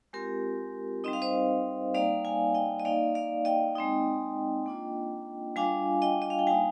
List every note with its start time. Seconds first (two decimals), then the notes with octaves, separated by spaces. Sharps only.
0.13 G#3 C4 F4 G4 A#4
1.04 G3 C4 D#4 D#5
1.13 F5
1.22 C5 D#5
1.95 G3 A#3 D#4 D5 F5
2.25 F5 G#5
2.54 D#5 G5
2.80 D#5
2.85 A#3 D#4 D5 F5
3.15 D5 F5
3.45 D#5 G5
3.76 G#3 C4 D#4
4.66 A#3 D4 F4
5.56 G3 D4 F4 F5 G#5
6.02 D#5 G5
6.22 D#5
6.30 F5
6.39 G5
6.47 G3 A#3 D#4 F5 G#5